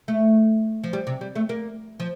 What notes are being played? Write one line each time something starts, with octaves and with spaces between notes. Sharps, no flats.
A3
F3
G3
C3
G3
A3
A#3
F3